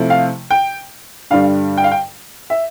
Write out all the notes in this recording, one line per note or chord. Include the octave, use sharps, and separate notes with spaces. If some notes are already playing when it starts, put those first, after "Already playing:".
Already playing: C3 F3 A3 E4
F5
G5
G2 D3 G3 D4 F5
G5
F5
G5
E5